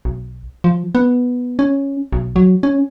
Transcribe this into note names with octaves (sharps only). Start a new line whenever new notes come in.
B1
F3
B3
C#4
B1
F#3
C#4